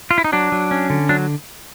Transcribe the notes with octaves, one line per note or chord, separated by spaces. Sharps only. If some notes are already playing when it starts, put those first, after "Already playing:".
F4
E4
D#4
F#3 D4
F#3
C#4
D3
F#3 D4